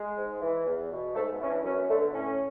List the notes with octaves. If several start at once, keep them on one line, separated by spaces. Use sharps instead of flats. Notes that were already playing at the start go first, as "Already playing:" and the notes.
Already playing: G#3
G#2
E3
E2
B2
G#2 A3
B3
E3 C#4
D4
F#2 C#4
B3
D3 A3
B3
A2 C#4